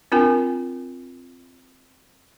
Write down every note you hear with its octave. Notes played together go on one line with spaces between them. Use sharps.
C4 D4 F4 A#4 G5 G#5